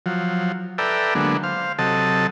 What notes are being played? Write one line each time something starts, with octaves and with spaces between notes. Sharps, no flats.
F3 F#3
A4 B4 D5 E5 G5 A#5
D3 F#3 G#3 A#3 B3 D4
C5 F5
C3 F#3 A4 D#5 A5